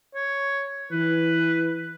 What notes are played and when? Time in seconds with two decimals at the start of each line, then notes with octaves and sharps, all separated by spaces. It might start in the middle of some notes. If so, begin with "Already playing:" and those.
0.15 C#5
0.92 E3 B4